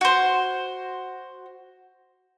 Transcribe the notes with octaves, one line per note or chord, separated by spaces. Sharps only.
F#4 C5